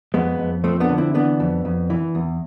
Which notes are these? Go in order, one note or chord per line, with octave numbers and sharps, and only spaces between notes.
F2 G#3 B3
F2
F3 A3 C4
B3 D4
D3
C4 E4
E3 B3 D4
F2
F2
E3
E2